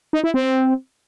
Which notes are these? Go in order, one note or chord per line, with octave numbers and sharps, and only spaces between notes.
D#4
E4
C4